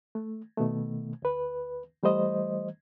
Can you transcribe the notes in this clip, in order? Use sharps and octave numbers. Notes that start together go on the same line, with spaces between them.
A3
B2 D#3 A3
D2 B4
E3 G3 A3 C5 D#5